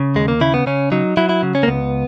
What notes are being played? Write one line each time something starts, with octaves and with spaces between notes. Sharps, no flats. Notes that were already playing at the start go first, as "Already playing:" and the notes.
Already playing: C#3
D#2 G#3
A#3
C#3 E4
B3
C#3 C#4
F#3 D#4
F#3 E4
E4
C#3
C#4
A#3
C#2 B3